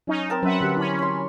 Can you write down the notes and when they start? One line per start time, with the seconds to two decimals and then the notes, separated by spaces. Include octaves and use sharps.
0.07 F#3 C#4 D#4
0.30 C4 A#4 A5
0.43 F#3 C#4 B4 E5 F#5
0.61 D3 G4
0.77 C#4 E4 B5
0.99 C#5 C6